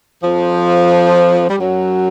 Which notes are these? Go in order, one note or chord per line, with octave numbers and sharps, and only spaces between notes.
F2 F3
G3
F#2 F#3